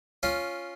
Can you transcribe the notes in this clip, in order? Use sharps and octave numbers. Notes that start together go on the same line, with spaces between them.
C#4 F4